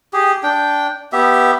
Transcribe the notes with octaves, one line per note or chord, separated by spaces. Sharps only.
G4 G#4
D4 G5
B3 G4 E5